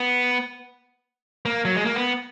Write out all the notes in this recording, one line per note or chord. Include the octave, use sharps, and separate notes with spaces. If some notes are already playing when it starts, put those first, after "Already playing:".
Already playing: B3
A#3
F#3
G#3
A#3
B3